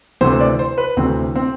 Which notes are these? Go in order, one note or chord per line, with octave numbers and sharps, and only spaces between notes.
D2 C3 E3 C5
D5
C5
B4
D2 C3 E3 C4
C4